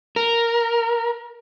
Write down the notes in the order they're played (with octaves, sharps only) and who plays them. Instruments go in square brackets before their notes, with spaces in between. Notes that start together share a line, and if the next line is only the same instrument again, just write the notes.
[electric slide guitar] A#4